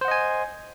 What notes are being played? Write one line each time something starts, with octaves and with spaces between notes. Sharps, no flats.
C5 D#5 F#5 G#5